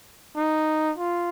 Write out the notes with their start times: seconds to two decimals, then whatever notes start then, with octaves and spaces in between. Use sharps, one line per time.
0.36 D#4
0.98 F4